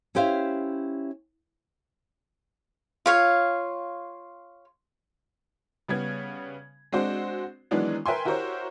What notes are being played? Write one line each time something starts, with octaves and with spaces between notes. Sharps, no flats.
C#4 E4 G4 C5 E5 F5
F4 C#5 F5
C#3 G3 B3 G#6
G#3 C4 D4 F#4 C5
D#3 E3 F#3 G#3 B3 D4
A#4 B4 E5 G5 G#5 C6
E4 F#4 G4 A#4 C5 C#5